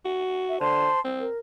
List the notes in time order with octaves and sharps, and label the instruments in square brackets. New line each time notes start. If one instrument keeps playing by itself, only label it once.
[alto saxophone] F#4
[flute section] E5
[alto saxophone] D3 [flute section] C5 A5 C6
[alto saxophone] C4
[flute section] A#4